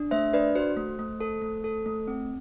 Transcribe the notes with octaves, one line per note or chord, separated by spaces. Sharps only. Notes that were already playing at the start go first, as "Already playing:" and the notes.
Already playing: D4
A3 C5 E5
D4 B4 D5
F#4 C5
A3
A3
A4
A3
A4
A3
C4